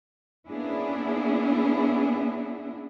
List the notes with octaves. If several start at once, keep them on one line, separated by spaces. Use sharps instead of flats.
A#3 B3 C#4 D4 E4 G#4